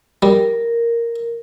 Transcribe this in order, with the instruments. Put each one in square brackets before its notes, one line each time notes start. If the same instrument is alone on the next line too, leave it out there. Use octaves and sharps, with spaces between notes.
[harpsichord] G3 [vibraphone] A#4